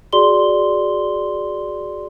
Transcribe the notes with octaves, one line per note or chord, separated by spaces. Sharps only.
F#4 G#4 D5 C6 G7